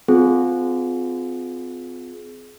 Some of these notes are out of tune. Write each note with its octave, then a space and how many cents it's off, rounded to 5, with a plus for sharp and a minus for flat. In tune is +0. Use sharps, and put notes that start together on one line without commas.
C4 -35 F4 +20 G#4 +25